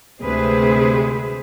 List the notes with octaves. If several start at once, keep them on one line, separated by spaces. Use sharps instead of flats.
D2 C3 G#3 G#4 B4 C5